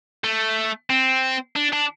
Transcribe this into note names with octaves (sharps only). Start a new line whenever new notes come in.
A3
C4
D4
D4